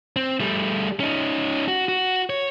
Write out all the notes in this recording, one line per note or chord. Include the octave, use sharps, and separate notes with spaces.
C4
G3 A3
C#4 D#4
F#4
F#4
C#5